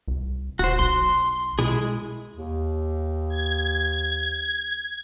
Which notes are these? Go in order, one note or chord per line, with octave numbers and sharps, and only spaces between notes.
C2
D#1 F#4 C5
B1 C6
B2 G#3 E4 G#4
D#2
G#6